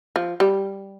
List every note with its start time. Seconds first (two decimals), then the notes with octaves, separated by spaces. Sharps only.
0.16 F3
0.40 G3